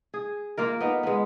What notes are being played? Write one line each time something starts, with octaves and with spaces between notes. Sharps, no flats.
G#4
A#3 F4 A#4
B3 D#4
G#3 B3